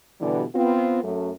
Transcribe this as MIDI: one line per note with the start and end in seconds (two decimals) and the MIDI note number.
0.20 0.43 47
0.20 0.43 50
0.20 0.43 52
0.20 0.43 55
0.55 1.02 59
0.55 1.02 60
0.55 1.02 65
1.03 1.30 42
1.03 1.30 57